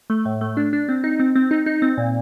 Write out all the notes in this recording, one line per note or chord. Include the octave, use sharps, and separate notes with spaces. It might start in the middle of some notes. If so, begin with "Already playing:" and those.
A3
A2
A3
D4
D4
C4
D#4
C4
C4
D#4
D#4
C4
A#2